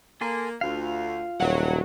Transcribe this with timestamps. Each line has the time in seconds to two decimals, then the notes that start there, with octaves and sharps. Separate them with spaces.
0.21 A#3 A4 G#5 C6
0.61 D2 F4 F5
1.40 D#1 F#3 F#5